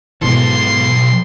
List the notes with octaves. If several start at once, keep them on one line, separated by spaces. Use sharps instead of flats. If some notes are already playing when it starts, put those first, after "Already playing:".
B1 G#2 B2 E3 A4 C6